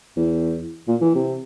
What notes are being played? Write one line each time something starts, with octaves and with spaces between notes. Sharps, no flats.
E2
A#2
E3
C3